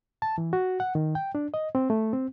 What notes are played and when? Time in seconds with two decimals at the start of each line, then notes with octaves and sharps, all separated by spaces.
0.22 A5
0.38 E3
0.53 F#4
0.80 F#5
0.95 D#3
1.15 G5
1.35 D4
1.54 D#5
1.75 C4
1.90 A3
2.13 C4